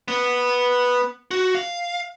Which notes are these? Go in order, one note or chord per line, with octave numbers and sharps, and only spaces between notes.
B3
F#4
F5